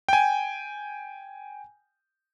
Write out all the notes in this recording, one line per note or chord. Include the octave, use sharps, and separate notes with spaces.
G5 G#5